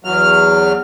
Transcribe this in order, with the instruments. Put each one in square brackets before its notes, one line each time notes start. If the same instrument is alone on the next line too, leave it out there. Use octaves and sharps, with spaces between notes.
[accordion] E2 F#3 F6